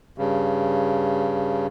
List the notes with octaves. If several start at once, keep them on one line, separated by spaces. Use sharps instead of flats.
G2 C#3